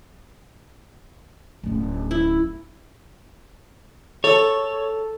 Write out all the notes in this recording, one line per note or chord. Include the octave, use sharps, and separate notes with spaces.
D1 C#4
E4
A4 C#5